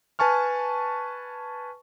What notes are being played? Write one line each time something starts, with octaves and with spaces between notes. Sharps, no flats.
B4 G#5 A5 C#6 F6